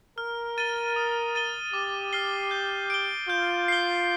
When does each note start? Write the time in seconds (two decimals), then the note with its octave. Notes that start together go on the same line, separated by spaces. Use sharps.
0.18 A#4 F6
0.58 A6 D#7 G7
0.96 D#6
1.35 A6 D#7 G7
1.73 G4 D6
2.13 F6 C7 G7
2.51 G6
2.90 D7 G7
3.28 F4 G6
3.68 C7 G7